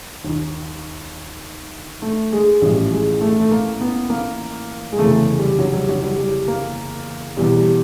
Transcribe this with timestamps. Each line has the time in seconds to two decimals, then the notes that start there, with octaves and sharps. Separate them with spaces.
0.24 D#2
0.29 D#3
2.02 A3
2.33 G#3
2.62 A1 A2 F3 G3
2.92 G#3
3.21 A3
3.40 A3
3.51 A#3
3.80 B3
4.10 A#3
4.92 G#3
4.99 F1 E2 C#3 A3
5.39 G3
5.59 F#3
5.74 G3
5.89 F#3
6.03 G3
6.18 G3
6.48 A#3
7.37 E2 B2 G3
7.57 G3